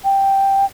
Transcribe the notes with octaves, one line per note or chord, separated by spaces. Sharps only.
G5